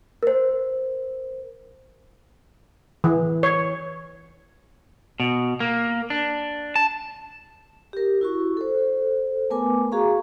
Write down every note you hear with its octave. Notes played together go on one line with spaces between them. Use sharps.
A#4 C5
E3
C#5
B2
A#3
D4
A5
G4 A#4
E4 F#4 C#6
A4 C5
A3 B3 A#4 B4 G#5 D6
F#4 G#4 F5 A#5 C#6